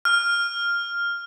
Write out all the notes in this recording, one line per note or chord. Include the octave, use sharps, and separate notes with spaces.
F6